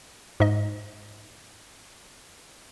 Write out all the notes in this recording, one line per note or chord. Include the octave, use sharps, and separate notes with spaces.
G#2 D#5